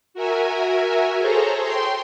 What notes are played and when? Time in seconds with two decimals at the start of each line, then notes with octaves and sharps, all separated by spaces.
0.14 F#4 A#4 E5 G#5
1.19 G#4 A4 C5 C#5 A#5
1.61 G5 C6